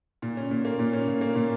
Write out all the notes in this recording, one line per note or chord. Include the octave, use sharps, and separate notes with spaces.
A#2
C#4
A#2
A#3
A#2
C#4
A#2
A#3
A#2